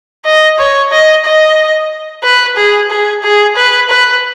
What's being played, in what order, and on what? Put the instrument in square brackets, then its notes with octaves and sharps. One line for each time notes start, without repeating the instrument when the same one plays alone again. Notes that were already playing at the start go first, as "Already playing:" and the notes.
[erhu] D#5
C#5
D#5
D#5
B4
G#4
G#4
G#4
B4
B4